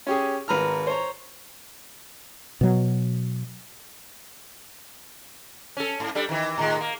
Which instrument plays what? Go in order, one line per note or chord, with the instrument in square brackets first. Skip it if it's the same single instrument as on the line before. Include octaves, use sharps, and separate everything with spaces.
[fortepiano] C#4 G4 G#4
G#1 B4 A#5 F6
C5 C#5 A#5
[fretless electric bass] B2 F#3
[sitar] C#4 A4
G#2
G3 D4 A4
D#3 E3
A2 D#3 G#3
A#3